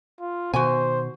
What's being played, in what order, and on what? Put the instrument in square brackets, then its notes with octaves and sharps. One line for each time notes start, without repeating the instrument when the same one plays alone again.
[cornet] F4
[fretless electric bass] B2 D#3 [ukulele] F#4 G#5 [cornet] C5